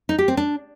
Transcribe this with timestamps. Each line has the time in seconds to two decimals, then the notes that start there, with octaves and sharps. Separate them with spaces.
0.09 D#4
0.18 G4
0.28 C4
0.37 D4